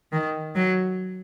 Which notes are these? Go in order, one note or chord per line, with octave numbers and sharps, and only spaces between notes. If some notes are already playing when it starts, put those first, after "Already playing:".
D#3
F#3